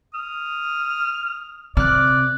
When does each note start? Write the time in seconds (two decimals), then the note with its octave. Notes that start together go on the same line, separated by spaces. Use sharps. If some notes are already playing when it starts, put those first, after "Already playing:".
0.14 D#6 F6
1.77 C3 D5 F6 F#6